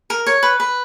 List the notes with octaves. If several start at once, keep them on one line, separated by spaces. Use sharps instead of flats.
A#4
C#5
B4
B4